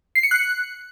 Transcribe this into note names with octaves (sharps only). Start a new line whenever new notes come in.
C7
C#7
F#6